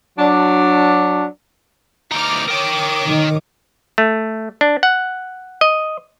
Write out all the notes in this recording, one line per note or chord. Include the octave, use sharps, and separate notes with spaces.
F#3 D4
D2 D#4 D6 F6
A#4 C#5 G5 D6 D#6
D#3
A3
D4
F#5
D#5